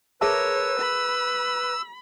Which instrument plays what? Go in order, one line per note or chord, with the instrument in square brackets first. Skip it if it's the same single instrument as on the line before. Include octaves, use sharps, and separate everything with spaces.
[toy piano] G#4 E5 A5 [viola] A#4 C#5 [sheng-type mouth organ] B4 [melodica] E6
[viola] B5